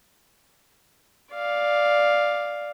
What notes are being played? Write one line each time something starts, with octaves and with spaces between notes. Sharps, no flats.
D5 F5